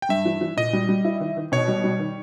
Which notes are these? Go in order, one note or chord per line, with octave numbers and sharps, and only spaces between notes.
G5
G2 E5
E3
E3
A#2 D#5
G3
G3
E4
D#3
D#3
B2 C#5
G3
G3
D#3